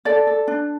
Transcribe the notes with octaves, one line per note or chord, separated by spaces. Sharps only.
A4 D5
A4
D4